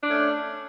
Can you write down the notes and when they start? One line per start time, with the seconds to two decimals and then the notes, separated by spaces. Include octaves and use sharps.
0.01 D4
0.06 A3
0.11 C#4